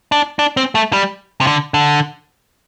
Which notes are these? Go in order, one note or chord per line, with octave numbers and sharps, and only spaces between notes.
D4
D4
C4
A3
G3
C3
D3
D3